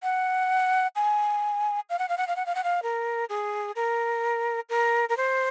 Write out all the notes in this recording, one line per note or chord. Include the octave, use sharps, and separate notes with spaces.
F#5
G#5
F5
F#5
F5
F#5
F5
F#5
F5
F#5
F5
A#4
G#4
A#4
A#4
A#4
C5